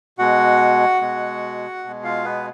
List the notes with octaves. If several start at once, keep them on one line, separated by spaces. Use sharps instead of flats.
B2 G#3 F#4 F#5
B2 G#3
B2 G#3
F4 F5
B3 B4